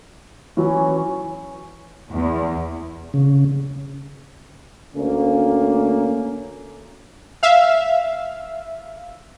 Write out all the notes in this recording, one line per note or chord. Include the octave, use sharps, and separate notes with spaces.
E3 F#3 C#4
E2
C#3
D2 A#3 C#4
E5 F5